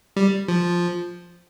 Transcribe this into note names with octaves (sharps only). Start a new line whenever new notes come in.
G3
F3